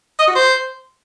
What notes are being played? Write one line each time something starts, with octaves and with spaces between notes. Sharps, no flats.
D#5
F#4
C5